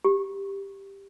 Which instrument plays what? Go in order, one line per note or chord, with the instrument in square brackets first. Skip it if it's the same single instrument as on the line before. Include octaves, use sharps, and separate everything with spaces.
[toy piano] G4